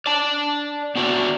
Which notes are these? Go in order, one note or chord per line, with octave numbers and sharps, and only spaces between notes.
D5 A5
B3 D4 F#4 D5 E5